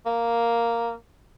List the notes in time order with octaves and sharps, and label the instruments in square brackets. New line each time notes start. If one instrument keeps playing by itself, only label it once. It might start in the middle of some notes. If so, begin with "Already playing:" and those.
[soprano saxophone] A#3